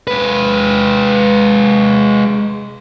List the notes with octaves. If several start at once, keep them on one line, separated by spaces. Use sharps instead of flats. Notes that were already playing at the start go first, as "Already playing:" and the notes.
G#3 B4